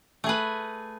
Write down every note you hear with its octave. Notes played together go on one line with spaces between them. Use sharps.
A3 G#4 B4